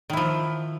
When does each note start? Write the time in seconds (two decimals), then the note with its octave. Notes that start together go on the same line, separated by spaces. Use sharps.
0.10 D#3
0.13 E4
0.17 F3